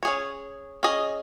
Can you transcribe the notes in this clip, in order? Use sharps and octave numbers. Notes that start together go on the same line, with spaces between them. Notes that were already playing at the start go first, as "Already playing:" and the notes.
C#4 G#4 C#5
C#4 G#4 D#5